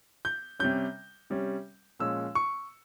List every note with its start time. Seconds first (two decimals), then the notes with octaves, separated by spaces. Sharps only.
0.25 G6
0.59 C3 G3 C#4 G6
1.30 C3 G3 C#4
1.99 A#2 F3 G#3 C#4 E6
2.35 C#6